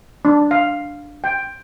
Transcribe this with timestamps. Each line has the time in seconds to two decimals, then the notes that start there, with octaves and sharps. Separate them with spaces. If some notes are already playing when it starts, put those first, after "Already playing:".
0.25 D4
0.51 F5
1.24 G5